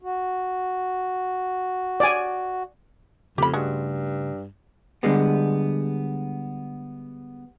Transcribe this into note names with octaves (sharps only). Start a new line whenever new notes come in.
F#4
D5 G#5
F2 C#3 A3 G4 B5
G2 G#3 F#4
D3 G3 G#3 B3